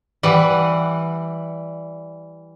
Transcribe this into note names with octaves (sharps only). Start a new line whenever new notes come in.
E3 G3 F#5